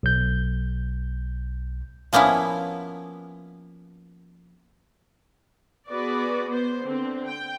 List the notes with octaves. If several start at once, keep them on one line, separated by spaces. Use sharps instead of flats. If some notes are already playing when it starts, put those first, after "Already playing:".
B1 G6
F3 A#3 B3 C#4 E4
B3 F#4 G#4 B4 D5
B3 C5
D3 C4
G5